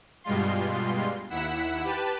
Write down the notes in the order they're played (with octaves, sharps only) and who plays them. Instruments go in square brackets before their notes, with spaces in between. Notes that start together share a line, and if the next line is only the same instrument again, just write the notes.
[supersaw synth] G2 B2 G3 G#3 F4 C6
D#2 E4 F#5 B6 E7
G4 B4 A5